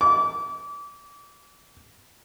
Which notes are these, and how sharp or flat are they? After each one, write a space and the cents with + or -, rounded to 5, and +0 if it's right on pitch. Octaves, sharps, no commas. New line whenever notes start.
D6 -30